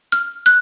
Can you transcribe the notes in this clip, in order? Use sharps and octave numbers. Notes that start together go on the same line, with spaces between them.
F6
F#6